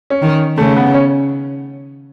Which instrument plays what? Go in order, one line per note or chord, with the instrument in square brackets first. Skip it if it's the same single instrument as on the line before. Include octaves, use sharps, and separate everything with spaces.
[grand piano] C#4
[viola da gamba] D#3
[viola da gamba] C#3 [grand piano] A3
[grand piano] B3
C#4